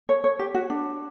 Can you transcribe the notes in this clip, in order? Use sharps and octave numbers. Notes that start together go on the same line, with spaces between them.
C#5
C#5
G4
F#4
D4